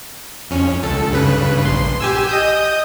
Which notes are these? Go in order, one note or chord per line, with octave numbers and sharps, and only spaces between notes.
F2 C#4
C#2 A4
G2 C#3 B4
A#1 C6
G4 G#5 E6
D#5 D#6 G6